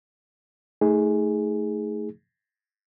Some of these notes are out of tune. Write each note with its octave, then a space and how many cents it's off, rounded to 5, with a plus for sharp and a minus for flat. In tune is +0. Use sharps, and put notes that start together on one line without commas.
A3 +0 D#4 +35 G#4 +0